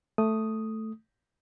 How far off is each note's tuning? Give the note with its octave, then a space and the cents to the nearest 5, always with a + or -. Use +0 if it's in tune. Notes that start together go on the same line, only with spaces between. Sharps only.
A3 +0 D#6 +0